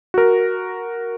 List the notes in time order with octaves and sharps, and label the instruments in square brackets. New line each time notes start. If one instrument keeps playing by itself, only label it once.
[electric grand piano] F#4 A#4